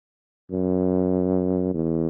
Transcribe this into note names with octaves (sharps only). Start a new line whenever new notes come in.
F#2
E2